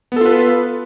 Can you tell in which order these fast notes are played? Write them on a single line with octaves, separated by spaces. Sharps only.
B3 A4 F4 B4